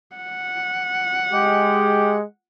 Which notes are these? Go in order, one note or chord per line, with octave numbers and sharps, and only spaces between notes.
F#5
G#3 G4